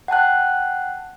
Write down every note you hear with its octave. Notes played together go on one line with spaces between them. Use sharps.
F#5 G5 A5 F#6